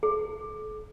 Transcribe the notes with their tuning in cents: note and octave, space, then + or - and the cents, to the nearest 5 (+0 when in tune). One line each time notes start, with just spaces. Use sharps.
A4 -45